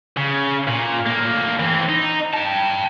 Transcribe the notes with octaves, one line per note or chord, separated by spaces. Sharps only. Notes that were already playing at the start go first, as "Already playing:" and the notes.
C#3
A#2
A2 A#3
E3 C4
D#4
G5 A5